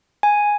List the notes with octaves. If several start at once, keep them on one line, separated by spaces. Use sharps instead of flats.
G#5